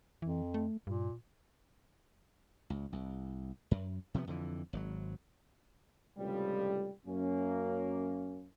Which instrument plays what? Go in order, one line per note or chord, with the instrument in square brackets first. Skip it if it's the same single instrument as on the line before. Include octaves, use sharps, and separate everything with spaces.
[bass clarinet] F2 [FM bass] E3
[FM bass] A3
[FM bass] G2 [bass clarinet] A#2
[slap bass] C#2
C2
F#2
C3 F3 G3 B3
F2 D3 E3
G#1 C3 F#3
[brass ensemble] C#2 A2 C3 D#3 F3 G3
F#2 A#3 C#4